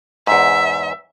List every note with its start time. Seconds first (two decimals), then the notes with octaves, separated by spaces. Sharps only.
0.27 E2 G#2 E5